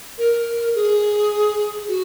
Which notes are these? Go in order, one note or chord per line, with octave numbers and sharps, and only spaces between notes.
A#4
G#4
F#4